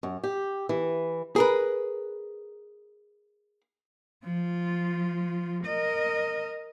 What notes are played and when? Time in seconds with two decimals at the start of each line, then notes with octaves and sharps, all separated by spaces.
0.03 F#2
0.23 G4
0.69 E3
1.36 G#4 A#4 B4
4.24 F3 F4
5.65 A#4 D#5